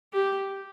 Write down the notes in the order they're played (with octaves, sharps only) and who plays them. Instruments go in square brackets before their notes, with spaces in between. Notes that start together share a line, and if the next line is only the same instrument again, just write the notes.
[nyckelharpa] G4